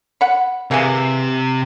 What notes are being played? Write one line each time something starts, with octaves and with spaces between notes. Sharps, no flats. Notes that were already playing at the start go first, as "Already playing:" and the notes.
F#5 B5
C3 E3 A#3 G#4